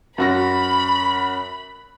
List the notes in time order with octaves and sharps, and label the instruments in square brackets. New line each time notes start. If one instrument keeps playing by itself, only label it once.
[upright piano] F#2 F#4 A#6 [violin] B5